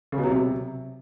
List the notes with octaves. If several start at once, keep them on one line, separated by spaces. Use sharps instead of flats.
C#3
B2
F#3
C3